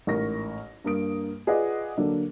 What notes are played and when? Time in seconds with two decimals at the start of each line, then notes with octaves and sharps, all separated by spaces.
0.07 A1 G#2 A#4 C#6 A#6
0.84 G2 A#3 A#4 D#6 D7
1.47 F4 G#4 B4 D5 D#5 F#5
1.97 D3 F#3 A#3 D4 A4